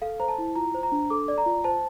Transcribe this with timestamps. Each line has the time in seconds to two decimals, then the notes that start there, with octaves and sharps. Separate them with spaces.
0.02 A4 F5
0.20 C5 A#5
0.28 A5
0.38 E4
0.56 F4 A#5
0.74 C5
0.83 A#5
0.92 D4
1.10 A4 D6
1.28 D5
1.38 A#5
1.46 F4
1.64 C5 A5